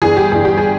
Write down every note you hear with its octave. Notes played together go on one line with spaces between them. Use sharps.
G1 G2 E3 G#4
G4
G1 G2 E3 G#4
G4
G#4